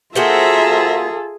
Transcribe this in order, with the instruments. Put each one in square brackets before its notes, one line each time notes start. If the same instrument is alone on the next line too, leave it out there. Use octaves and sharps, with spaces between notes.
[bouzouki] A#3 F#4 C5 [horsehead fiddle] F4 A4 [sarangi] G#4 [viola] E5 A#5